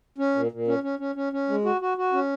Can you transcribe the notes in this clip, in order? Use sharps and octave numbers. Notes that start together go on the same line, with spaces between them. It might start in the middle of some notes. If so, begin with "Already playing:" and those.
C#4
A#2
A#2
C#4
C#4
C#4
C#4
C#4
G#3
F#4
F#4
F#4
C#4